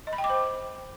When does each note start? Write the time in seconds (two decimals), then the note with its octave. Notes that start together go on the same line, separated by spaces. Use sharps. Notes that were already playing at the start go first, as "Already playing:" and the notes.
0.07 D#5
0.13 B5
0.18 G5
0.24 D6
0.30 C5